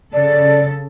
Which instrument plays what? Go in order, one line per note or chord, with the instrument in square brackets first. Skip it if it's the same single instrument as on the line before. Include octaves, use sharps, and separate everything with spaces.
[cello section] C#3 A4 [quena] D5